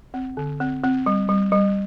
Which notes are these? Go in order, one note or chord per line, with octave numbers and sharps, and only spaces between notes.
C4
D3
C4
C4
G3
G3
G3